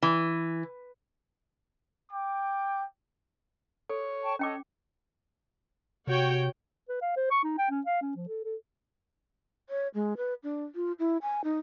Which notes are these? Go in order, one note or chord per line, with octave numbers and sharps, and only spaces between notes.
E3
G5 D6
A4 C#5
G5 A5 C#6
C#4 A4 C#5 D#5 G5 D6
C3 F#4 C#5 G5
B4
F5
C5
C#6
D#4
G5
C#4
F5
C#4
F3
A4
A4
C#5
G#3
B4
D4
F4
E4
G#5
D#4